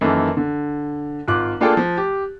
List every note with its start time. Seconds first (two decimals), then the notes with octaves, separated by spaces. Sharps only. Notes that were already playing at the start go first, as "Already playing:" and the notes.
0.01 F#2 D#3 E3 A#3 A4
0.37 D3
1.28 G#1 F4 D6 F#6
1.60 A#3 D4 F4 G#4 A4 G5
1.77 F3
1.98 G4